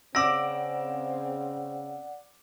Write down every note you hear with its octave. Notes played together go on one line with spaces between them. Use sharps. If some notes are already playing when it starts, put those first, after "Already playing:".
C#3 C4 D5 F#5 D6 E6 A#6